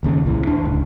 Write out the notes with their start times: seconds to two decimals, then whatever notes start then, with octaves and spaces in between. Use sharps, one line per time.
0.03 F#1 D#2 C#3
0.26 C2 A#2 E3
0.47 D#2 D4
0.64 D1 C#2